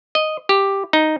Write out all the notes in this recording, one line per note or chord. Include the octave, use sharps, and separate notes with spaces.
D#5
G4
D#4